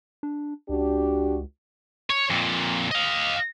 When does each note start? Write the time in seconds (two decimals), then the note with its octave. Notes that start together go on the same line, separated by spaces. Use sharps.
0.23 D4
0.69 C#2 D4 F#4 G4
2.10 C#5
2.30 F2 A#2
2.91 D#5 F5